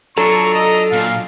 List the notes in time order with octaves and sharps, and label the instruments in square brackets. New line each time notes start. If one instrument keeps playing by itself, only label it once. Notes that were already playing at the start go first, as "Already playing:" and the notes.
[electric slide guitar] F#3 D4 F4 [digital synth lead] A4 [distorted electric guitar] A#5 [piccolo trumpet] C#6
[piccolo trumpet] D#5
[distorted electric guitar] A#2 [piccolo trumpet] F5